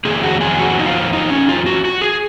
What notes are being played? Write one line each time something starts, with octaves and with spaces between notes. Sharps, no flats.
F2 D#3 A#3 G#4
F#4
G#4
F#4
D#4
F4
D#4
C#4
F4
F#4
F#4
G#4